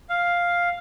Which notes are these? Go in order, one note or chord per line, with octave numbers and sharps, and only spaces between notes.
F5